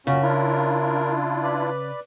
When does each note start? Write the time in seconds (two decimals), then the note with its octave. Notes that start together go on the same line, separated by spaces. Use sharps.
0.07 F#2 A#2 C#3 C#4 F#4
0.22 D4 E4 F4 A#4
1.43 B4 D5